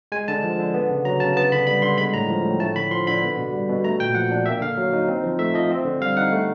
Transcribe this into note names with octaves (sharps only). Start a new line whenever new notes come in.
G#3 G#5
D3 A5
F3
D3
B3
C#3
F#3 A#5
C#3 A5
B3 A5
D3 B5
G3 B5
D3 C6
G#3 B5
A2 A#5
F3
A2
A3 A5
D3 B5
F3 C6
D3 B5
B3
B2
G3
B2
A3 A#5
A#2 G5
F3 F#5
D4
A#3 E5
D3 F5
F#3
D#4
C4
F3
A3 E5
F3 D#5
C4
D3
G3 F5
D#4 F#5
A3